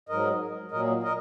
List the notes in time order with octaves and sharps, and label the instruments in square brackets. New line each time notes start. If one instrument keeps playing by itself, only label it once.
[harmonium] G#2 F#3 A#4 D#5
A#2 F#3 A#4 D#5
A#4 D#5